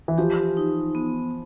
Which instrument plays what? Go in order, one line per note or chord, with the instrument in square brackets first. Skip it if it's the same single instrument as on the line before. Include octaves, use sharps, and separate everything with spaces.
[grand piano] E3
[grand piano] F3 [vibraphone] G4
[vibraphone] D#4
B3